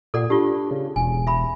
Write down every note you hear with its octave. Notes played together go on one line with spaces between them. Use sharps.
A#2 A4 D5 F#5
D4 F4 G4
C#3
E1 G#5
E5 B5